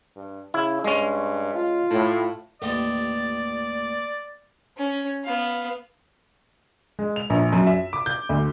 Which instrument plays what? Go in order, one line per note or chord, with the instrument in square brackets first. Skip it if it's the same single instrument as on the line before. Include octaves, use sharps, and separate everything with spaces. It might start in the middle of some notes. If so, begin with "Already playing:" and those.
[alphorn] G2
[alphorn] C#3 [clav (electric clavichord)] E4
[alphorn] G2 [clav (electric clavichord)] G#3 C#4
[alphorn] F4
[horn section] A2
[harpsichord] A1 D#2 D#5 [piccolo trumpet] D5
[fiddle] C#4
B3 F5
[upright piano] G#3
F7
A#1
F#2
E5
D6
G6
D2